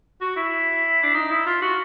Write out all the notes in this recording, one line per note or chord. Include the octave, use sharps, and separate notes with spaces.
F#4
E4
D4
D#4
E4
F4
F#4